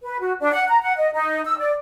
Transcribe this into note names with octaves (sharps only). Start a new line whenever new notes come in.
B4
F#4
D4
F#5
A#5
F#5
D#5
D#4
E6
D5